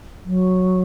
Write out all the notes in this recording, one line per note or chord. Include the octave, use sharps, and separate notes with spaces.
F#3